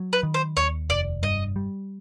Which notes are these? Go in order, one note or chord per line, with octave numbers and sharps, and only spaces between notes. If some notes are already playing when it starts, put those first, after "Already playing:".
Already playing: F#3
B4
D#3
C5
D#2 C#5
F1 D5
G2 D#5
G3